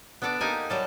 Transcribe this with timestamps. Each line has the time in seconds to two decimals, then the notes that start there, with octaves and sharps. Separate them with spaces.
0.22 B3 D4 A4 D5
0.41 A#3 D#4 G4 G#5
0.70 F#3 G3 A5